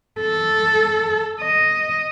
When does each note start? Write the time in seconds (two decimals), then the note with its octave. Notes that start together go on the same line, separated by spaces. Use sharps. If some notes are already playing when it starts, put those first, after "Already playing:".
0.21 A4
1.41 D#5